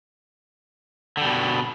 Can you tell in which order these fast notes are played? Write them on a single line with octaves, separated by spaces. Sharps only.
D3 G3 B2